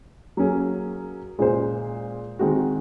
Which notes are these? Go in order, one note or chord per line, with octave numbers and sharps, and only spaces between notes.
F#3 A#3 C#4 G#4
A#2 G#3 C#4 G#4 C5
D#3 G#3 C4 F#4